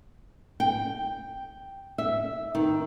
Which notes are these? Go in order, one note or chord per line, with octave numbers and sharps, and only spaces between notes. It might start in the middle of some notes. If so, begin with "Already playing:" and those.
G5
E5
D#3